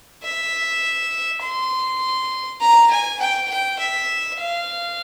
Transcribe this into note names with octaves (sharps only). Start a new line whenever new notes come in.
E5
C6
A#5
G#5
G5
G5
E5
F5